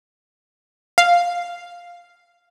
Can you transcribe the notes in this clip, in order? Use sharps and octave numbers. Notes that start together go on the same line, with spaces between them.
F5